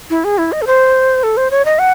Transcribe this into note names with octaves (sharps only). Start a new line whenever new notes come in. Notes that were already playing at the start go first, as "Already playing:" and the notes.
E4
G#4
E4
D#5
A4
C5
A4
C5
C#5
D#5
F#5